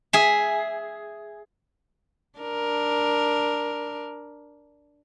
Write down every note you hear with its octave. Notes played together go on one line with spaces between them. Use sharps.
G#4 E5
D4 A#4